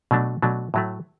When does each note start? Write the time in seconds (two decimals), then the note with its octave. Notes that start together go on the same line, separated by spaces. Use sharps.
0.11 B2 F#3 A3 D4
0.42 B2 F#3 A3 D4
0.74 A2 F#3 A3